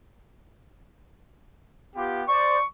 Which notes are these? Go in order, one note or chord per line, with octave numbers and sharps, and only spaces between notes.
B3 F4 G4
C5 D5 C#6